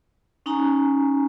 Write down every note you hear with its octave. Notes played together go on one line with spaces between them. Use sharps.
C#4 D#4 G#5 A#5